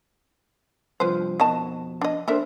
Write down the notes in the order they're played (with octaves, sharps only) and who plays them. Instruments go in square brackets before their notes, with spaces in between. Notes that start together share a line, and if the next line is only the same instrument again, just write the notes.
[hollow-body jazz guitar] G2 C3 F3 [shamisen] B4 C5
[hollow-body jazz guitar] F2 B2 [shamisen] D#3 D#5 A5
[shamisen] D4 D#5
[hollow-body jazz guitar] A#3 D4 C5 [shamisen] A4 A#4 E5